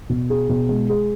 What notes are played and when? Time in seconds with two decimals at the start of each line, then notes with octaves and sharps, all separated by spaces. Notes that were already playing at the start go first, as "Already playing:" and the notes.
0.09 B2
0.30 G#4
0.49 B2
0.69 G#3
0.89 G#4